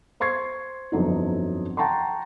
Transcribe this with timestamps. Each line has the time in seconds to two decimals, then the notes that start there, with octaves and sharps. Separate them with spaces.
0.20 C5 C6 C#6 G#6 C7
0.92 G1 F2 F#3 D#4
1.77 F#5 G5 A5 A#5 C6 C#6